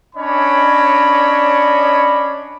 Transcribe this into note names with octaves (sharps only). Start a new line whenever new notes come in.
C#4 D4 C#5 D#5 B5